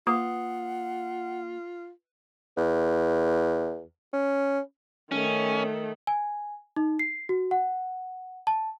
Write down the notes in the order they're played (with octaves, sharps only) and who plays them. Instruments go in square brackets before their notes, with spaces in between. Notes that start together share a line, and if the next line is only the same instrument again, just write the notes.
[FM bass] A#3 [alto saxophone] F4 [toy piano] B4 D#6 [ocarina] F#5
[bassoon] E2
C#4
[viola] D#3 A3 [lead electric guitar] C#4
[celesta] G#5
D#4
C7
F#4
F#5
A5